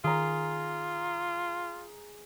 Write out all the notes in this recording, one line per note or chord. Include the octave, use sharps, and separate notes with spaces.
D#3 F4 G#4 A#5